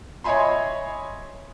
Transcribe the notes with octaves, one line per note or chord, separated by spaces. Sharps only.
C#5 D#5 E5 G#5 B5 C6